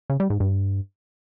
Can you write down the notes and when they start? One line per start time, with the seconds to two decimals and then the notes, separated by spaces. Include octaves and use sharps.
0.10 C#3
0.20 G3
0.30 G#2
0.40 G2